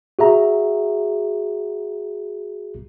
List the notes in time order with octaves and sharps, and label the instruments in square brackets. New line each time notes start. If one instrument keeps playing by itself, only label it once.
[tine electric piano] F#4 G#4 E5 A#5